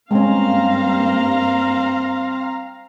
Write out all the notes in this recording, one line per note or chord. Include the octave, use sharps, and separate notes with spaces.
G2 G#3 A#3 C4 C#4 F5 A#5